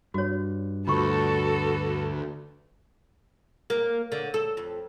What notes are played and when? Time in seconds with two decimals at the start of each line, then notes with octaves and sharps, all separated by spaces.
0.14 G2 F#4 C#5
0.87 D2 F4 F#4 A4 B4 C#6
3.70 A#3
4.12 D3
4.34 A4
4.57 F2